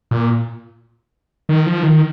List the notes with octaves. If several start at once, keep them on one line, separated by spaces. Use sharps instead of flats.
A#2
D#3
F3
D#3